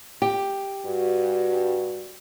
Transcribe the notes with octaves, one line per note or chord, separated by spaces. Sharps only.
G4
G2 F#4